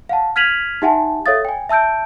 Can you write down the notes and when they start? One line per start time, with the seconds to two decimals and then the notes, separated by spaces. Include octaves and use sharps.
0.09 F5 F#5 A5
0.36 F6 G#6 B6 D#7 F7 F#7
0.82 D#4 G4 E5 F#5 G#5 A5
1.26 A4 C#5 E5 F5 D#6 A6
1.45 G5 G#5
1.69 E5 A5 E6 G6 D7